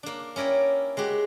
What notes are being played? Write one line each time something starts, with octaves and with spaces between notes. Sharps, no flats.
A#3 D4
C#4 E4 A#4 D5 G5
G#3 F#4 G4